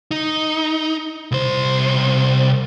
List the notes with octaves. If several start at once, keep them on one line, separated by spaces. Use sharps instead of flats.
D#4
C2 C5